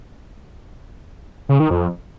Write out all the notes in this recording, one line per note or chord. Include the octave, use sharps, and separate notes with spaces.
C#3
D#3
F2